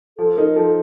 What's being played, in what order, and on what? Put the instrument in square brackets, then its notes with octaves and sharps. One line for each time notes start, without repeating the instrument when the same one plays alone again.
[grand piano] F3 [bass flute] A4
[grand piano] D#4 [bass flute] A#4
[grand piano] F3 [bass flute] A4